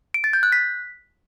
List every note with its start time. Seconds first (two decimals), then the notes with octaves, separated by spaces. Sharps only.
0.14 D7
0.24 A6
0.33 G6
0.43 F#6
0.52 B6